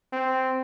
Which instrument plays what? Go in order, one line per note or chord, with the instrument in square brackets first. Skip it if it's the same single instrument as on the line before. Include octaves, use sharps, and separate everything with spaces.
[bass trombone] C4